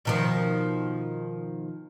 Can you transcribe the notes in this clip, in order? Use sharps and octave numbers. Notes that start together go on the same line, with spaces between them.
B2 D#3 F3